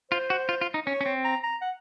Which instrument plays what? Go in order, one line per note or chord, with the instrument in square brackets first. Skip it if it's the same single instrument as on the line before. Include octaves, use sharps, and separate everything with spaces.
[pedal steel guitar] F4 [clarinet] C5
[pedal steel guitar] F#4
F4
F4
D#4
[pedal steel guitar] C#4 [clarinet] C#5
[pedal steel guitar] C#4
C4
[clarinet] A#5
A#5
F#5